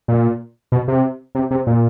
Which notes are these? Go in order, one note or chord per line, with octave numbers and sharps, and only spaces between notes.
A#2
B2
C3
C3
C3
A#2